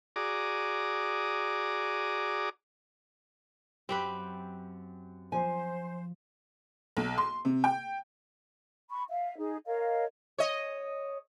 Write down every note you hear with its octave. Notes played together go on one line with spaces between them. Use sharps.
F#4 G#4 D5 A#5 D6 D#6
F#2 C4 G4 B4
F3 C5 G#5
B1
C6
C3
G5
B5 C#6
E5 F5
D#4 G#4
A#4 C#5 D#5 F5
C#5 D#5